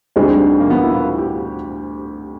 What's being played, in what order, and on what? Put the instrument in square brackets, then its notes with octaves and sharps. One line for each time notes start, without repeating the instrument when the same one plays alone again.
[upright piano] D2 D3 G3 C4 D#4 [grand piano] G#3
[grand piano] A#3
B3
E4
F4
G4